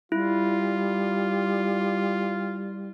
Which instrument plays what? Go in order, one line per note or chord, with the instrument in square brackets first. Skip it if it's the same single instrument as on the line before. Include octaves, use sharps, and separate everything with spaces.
[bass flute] G3 [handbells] E4 [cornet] F4